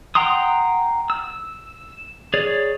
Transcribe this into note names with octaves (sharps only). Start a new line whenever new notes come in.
F#5 G5 A#5 C6 D#6
E6
G#4 C#5 D5